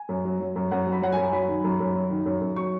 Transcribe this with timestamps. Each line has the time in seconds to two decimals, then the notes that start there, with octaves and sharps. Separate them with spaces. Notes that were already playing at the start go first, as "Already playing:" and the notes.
Already playing: G#5
0.09 F#2
0.25 F#3
0.40 F#3
0.56 F#2
0.71 F#2 F#5
0.87 F#3
0.92 B5
1.02 F#3 F#5
1.12 F#2 G#5
1.33 F#3 B5
1.48 D#3
1.64 F#2
1.80 F#2
1.96 F#3
2.10 D#3
2.26 F#2
2.41 F#2
2.56 F#3 C#6